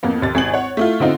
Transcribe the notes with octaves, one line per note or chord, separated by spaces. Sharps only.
F2 A#3 B3
D#2 A6
G#1 G#5 F#7
C#5 F#5
A3 E4 F4
D3 C4 D#4 F4